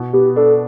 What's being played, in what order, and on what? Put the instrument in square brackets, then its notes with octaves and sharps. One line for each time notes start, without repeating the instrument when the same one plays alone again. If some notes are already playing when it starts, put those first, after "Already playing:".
Already playing: [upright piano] B2
[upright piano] B3 [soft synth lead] G4
[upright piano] D4 [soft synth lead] A4